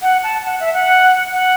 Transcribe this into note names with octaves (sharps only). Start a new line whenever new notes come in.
F#5
A5
F#5
E5
F#5
F#5